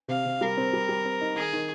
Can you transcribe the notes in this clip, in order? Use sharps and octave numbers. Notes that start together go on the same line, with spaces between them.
C3 F5
C3
G3 A#4
C4
G3
G3
C4
D#4
D#3 G#4
D#3